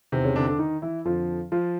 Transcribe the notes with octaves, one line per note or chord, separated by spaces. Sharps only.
E2 C3 D#3 C4
C#3 C#4
D3 D4
D3 D4
D#3 D#4
E3 E4
F2 D3 F3 F4
F3 F4